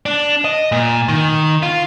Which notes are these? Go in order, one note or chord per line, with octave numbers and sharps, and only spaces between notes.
D4
D#5
A#2
D#3
F4